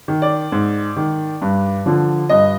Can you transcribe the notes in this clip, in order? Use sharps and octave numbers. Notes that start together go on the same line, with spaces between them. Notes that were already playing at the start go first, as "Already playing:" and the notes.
D#3
D5
G#2
D#3
G2
D3 F3
G2 D#5